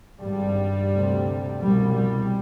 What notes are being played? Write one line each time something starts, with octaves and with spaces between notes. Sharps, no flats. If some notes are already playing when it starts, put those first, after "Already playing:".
G#1 G2 G3
D2 C3
C2 B2 G3
G3